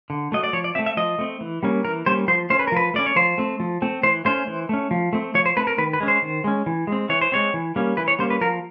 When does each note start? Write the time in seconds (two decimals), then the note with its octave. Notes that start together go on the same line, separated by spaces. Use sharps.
0.10 D3
0.32 F#3 A3 D#5
0.44 D5
0.53 F3 C#5
0.64 D5
0.75 A3 C4 E5
0.86 E5
0.97 F3 D#5
1.19 A3 C4
1.41 E3
1.63 G3 A#3 C#4
1.85 E3 A#4
2.06 G3 A#3 C#4 C5
2.28 F3 C5
2.50 A3 C#4 C5
2.59 B4
2.68 A#4
2.72 F3 B4
2.94 A3 C#4 D5
3.06 C#5
3.16 F3 C5
3.38 A3 C4
3.60 F3
3.82 A3 C4
4.03 E3 C5
4.25 A3 C#4 C5
4.47 E3
4.69 A3 C#4
4.91 F3
5.13 A3 C4
5.35 F3 C#5
5.46 C5
5.57 A3 C4 B4
5.67 A#4
5.78 D#3 B4
5.93 B4
6.00 G#3 C#4
6.08 C5
6.22 D#3
6.44 G#3 C#4
6.66 E3
6.87 G#3 C4
7.09 E3 C#5
7.21 C5
7.32 G#3 C4 C#5
7.54 E3
7.76 G3 A#3 C#4
7.97 E3 B4
8.08 C#5
8.19 G3 A#3 C#4 C5
8.30 B4
8.41 F3 A#4